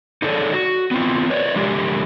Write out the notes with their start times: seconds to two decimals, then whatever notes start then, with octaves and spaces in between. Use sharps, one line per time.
0.22 D#4 G#4 A4 C#5 D5
0.54 F#4
0.91 B3 C4 F4
1.30 B4 C#5 D5
1.56 D3 F3 G#3 G4 A#4